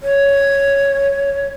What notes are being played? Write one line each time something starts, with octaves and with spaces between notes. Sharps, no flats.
C#5